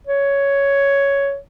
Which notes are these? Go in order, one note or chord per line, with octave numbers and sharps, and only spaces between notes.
C#5